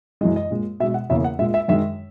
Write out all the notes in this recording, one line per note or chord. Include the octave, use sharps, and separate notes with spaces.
F#2 E3 G#3 D#5
D#5
A#2 G#3
B2 G#3 E5
F#5
E2 C#3 E3 A#3 E5
F#5
A#2 G#3 E5
E5
F#2 D#3 G#3 E5